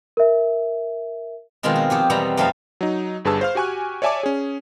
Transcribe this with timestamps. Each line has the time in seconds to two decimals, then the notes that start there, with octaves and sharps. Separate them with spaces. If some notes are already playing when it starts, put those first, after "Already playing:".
0.17 A#4 E5
1.63 B2 D#3 F3 G#3 C4 F4
1.76 F#4
1.90 F3 G4 G#4
2.10 E2 B2 G3 B3 C4 A#5
2.37 F2 A3 C4 D#4 F5 A5
2.81 F#3 D#4
3.25 G1 G2 G#4 B4 A5 E6
3.41 C5 F5 F6
3.55 F#4 G4 G#5 C#6 F#6
4.02 C#5 D5 E5 G#5 A5 D6
4.23 C#4 G#4